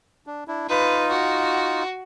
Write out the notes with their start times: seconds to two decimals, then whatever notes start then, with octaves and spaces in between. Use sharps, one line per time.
0.27 D4
0.48 D4 E4
0.69 D#4 F4 B4
1.11 F#4